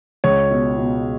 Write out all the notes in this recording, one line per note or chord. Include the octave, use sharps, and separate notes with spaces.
C#2 C#5
B2
B2